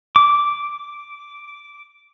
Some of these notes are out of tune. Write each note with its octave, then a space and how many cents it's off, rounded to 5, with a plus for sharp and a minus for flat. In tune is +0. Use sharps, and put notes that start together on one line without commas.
D6 -5